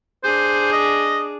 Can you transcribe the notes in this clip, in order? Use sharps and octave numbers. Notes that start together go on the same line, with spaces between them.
D4 G#4 C5
D#5